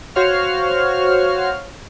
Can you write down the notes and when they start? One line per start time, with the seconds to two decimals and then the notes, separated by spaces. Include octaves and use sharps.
0.15 F#4 C5 C#5 F5 F6